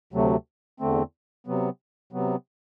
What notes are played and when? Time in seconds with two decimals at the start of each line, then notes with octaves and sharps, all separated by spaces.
0.13 D2 C3 F#3 A3
0.80 E2 D3 A3 C4
1.47 C3 F#3 B3
2.12 C3 F#3 B3